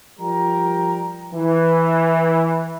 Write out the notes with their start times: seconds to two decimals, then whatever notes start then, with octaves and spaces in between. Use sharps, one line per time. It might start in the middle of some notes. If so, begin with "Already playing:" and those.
0.20 F3 G3 A#4 G5 A#5
1.33 E3